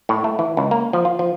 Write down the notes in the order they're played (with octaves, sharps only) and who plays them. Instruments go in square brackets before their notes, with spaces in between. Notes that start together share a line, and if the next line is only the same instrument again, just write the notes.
[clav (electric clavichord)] A2
A3
E3
C#2
A#3
F3
F4
F3